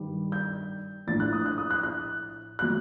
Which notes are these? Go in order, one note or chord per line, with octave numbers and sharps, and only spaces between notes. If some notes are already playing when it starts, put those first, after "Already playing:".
Already playing: G2 D#3 G3
G6
A#1 A2 A3 D4 A6
F#6
D#6
F#6
D#6
F#6
F#6
F#3 A3 F#6